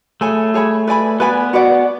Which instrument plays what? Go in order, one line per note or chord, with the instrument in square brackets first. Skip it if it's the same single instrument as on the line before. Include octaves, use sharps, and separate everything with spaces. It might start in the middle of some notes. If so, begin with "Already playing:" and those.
[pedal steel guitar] A3 [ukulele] G#4 C#5 G#5 B5
[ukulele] G#4 C#5 G#5 B5
B4 D5 G#5 B5
[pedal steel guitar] B3 [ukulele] B4 D5 G#5 B5
[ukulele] F#4 B4 D5 F#5